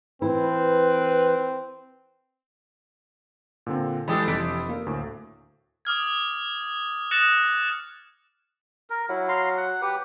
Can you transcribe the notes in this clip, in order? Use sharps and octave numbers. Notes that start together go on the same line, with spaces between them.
E3 C4 E4 B4
A#2 D3 C4
E3 G#3 D4 G4 A4 B5 D#6 E6
F1 B6 D7
A#3
D2 A2
D6 D#6 F6 G#6
D#6 F#6 A6 A#6 C#7 E7
A#4
F#3 E4
F5 A#5 C6
F#5
G4 B4